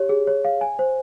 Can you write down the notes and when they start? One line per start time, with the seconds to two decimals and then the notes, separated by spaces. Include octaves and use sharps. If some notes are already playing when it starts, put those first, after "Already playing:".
Already playing: G4 C#5
0.09 G#4
0.27 C#5
0.45 F5
0.61 G#5
0.79 C5